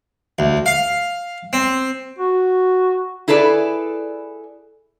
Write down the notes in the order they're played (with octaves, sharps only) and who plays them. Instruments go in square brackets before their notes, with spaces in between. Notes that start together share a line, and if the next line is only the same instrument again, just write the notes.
[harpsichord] D2
F5
C4
[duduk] F#4
[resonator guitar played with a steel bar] E4 G#4 A4 B4 D5